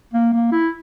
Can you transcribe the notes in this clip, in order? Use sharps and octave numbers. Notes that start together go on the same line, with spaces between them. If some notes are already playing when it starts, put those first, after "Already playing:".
A#3
A#3
E4